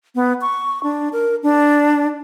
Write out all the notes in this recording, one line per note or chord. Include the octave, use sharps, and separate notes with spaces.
B3
C#6
D4
A#4
D4